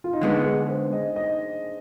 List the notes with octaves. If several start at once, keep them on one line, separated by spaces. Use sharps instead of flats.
F4
D#4
D3 G#3 B3 D4
G#4
C5
D#5
D#5